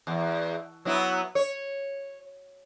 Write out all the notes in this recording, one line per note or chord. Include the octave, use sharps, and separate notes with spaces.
E2
F#3 B3 E4
C#5